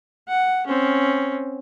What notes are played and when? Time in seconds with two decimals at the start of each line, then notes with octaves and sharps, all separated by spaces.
0.29 F#5
0.67 C4 C#4